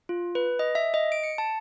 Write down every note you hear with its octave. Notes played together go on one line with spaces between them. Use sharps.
F4
B4
D#5
E5
D#5
D7
C#7
A5